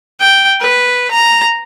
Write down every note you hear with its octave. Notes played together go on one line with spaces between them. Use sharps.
G5
B4
A#5